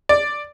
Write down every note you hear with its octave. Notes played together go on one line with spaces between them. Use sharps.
D5